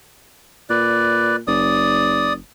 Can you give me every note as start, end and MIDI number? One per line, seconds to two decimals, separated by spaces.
0.70 1.40 46
0.70 1.36 71
0.70 1.36 74
1.47 2.39 30
1.47 2.33 74
1.47 2.33 87